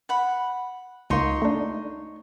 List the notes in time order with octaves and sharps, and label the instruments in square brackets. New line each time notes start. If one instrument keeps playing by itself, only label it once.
[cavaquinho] F#5 B5
[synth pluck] C#2 A#3 [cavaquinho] D#4 C#5 C6
[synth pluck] A3 D4